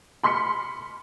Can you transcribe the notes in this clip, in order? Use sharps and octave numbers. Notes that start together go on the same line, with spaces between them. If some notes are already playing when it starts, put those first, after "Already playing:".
B5 C6 F6 B6 C#7